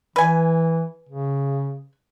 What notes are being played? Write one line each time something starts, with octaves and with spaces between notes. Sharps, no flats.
E3 B4 G#5
C#3